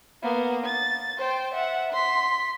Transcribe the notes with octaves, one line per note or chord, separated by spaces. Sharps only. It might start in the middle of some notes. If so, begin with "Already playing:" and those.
A#3 B3
A6
C5 G5
E5 F#5
C6 B6